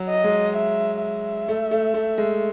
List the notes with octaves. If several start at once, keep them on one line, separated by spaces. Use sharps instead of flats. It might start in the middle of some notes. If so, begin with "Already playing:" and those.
Already playing: F#3
D#5
G#3
E5
E5
A3
A3
A3
G#3